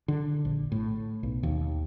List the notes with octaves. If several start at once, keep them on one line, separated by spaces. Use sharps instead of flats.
D3
A#1
A2
B1
D#2